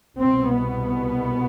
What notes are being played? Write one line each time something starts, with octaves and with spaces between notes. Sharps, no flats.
C2 B2 C4
B3